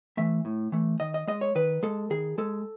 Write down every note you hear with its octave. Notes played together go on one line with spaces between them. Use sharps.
E3 A3 E5
A2
E3 A3
D#3 D#5
D#5
G#3 D#5
C#5
D#3 B4
G#3 A4
D#3 G#4
G#3 A4